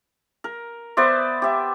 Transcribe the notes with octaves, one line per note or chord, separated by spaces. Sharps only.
A#4
B3 C5 D5 E5
G4 E5